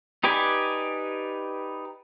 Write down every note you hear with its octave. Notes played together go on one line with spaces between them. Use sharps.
D#4 G4 B4 D5 G#5